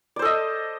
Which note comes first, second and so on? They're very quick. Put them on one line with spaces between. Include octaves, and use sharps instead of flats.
D5 C5 A4 D#5